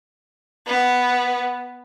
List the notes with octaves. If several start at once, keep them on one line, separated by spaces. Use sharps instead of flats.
B3